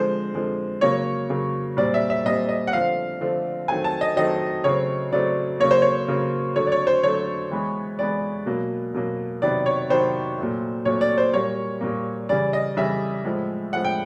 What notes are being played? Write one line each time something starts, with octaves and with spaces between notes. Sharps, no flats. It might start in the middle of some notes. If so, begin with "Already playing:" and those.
Already playing: D3 F3 G#3 C4 C5
D3 F3 G#3 C4
C#3 F#3 A#3 C#5
C#3 F#3 A#3
A#2 G3 C4 D5
E5
E5
A#2 G3 C4 D#5
D#5
F#5
D3 F3 A3 C4 F5
D3 F3 A3 C4
D#3 F#3 A3 C4 G#5
A5
D#5
D#3 F#3 A3 C4 D#5
C#3 F#3 A3 C4 C#5
C#3 F#3 A3 C4 D5
C#3 F#3 A#3 C#5
C5
C#5
C#3 F#3 A#3
D3 F#3 A3 C#5
D5
C#5
C5
D3 F#3 A3 C#5
E3 G#3 B3
E3 G#3 B3 D5
B2 F#3 A#3
B2 F#3 A#3
C3 D#3 F#3 B3 D5
C#5
C3 D#3 F#3 B3 C5
A#2 F#3 A3
A#2 F#3 A3 C#5
D5
C5
A#2 G3 A#3 C#5
A#2 G3 A#3
C#3 E3 G3 D5
D#5
C#3 E3 G3 E5
A2 F3 G#3
A2 F3 G#3 F#5
G5